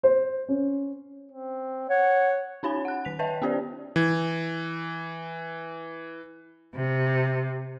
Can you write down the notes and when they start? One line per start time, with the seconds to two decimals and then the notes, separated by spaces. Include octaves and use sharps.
0.03 C5
0.48 C#4
1.31 C4
1.90 C#5 F#5
2.63 C#4 D#4 C#5 G#5 B5
2.85 F#5 F#6
3.05 D#3 B6 F7
3.19 B4 C#5 D#5 E5 G5 A5
3.42 B3 C#4 G4 C5 D5
3.96 E3 G#6
6.75 C3